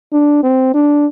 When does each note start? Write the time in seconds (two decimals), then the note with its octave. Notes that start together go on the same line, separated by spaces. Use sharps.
0.13 D4
0.43 C4
0.74 D4